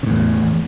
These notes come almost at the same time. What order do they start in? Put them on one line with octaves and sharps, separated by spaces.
C#3 A2 E2